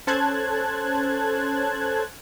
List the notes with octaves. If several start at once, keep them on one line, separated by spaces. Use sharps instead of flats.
C#4 A4 C5 A5 F#6 G#6